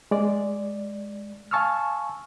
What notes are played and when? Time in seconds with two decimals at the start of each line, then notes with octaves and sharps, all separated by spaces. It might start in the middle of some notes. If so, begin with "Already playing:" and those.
0.11 G#3 D5
1.51 F5 G#5 A5 C#6 E6 F6